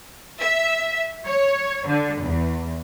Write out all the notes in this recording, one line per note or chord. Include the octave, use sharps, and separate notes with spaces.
E5
C#5
D3
E2